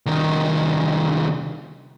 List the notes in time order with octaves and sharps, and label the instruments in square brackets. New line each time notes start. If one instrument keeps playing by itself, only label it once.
[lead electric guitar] C2 D#3